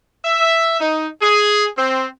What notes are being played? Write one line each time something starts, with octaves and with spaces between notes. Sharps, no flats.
E5
D#4
G#4
C4